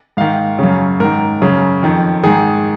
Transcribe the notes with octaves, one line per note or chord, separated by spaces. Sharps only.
G#2 D#3 F5
F#2 C#3
G#2 D#3 A#4
F#2 C#3
F2 D#3
G#2 D#3 G#4